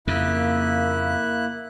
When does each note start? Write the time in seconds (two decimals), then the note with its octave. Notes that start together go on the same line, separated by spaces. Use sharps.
0.07 F2 C#3 A#3 E4 F#6